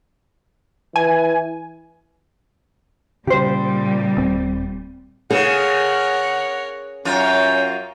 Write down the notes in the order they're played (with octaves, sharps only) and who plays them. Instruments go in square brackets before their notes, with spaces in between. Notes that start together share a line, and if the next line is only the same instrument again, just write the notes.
[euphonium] E3 [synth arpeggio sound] G#5
[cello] A#2 G3 [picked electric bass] C#3 [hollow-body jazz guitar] G4 C5
[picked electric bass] D#1 C4
[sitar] C#3 [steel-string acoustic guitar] G#4 [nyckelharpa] A#4 C#5 [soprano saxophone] F#5
[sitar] F#2 F4 [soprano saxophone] C#4 [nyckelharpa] C#5 G5